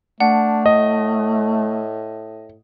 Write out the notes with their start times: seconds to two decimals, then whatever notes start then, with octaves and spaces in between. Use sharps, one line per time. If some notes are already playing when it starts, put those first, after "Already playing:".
0.20 A3 D4 F#5
0.66 A2 D#5